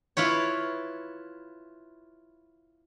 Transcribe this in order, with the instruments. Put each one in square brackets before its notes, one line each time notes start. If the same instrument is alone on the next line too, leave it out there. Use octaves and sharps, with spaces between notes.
[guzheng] E4 F4 B4 C#5